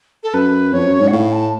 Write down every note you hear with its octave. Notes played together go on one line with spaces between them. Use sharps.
A4
F#2 B4
F2 C#5
F#2
G#2
F#5
A2 F5
A5